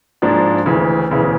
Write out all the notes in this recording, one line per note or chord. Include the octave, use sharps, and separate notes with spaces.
G#2 F3 A#3 D4
D2 C#3 E3
E1 D2 C#3 E3